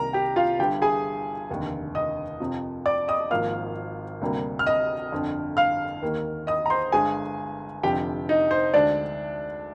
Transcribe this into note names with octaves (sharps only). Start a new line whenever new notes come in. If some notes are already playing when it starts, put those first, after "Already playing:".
Already playing: C2 C3 D#3 G3 A#3 A#4 A#5
G4 G5
F4 F5
G1 G2 D3 G4 G5
G#4 G#5
F1 D#2 D3
D#5 D#6
F2 C3 F3
D5 D6
D#5 D#6
G#1 G#2 F3 A#3 F5 F6
D2 C3 G3 A#3
F6
D#5 D#6
G1 F2 D3
F5 F6
D#2 D#3 A#3
D#5 D#6
A#5
C5 C6
G1 G2 D3 G#3 G#4 G#5
F1 F2 D3 F3 G4 G5
D#4 D#5
C5
D2 D3 G#3 D4 D5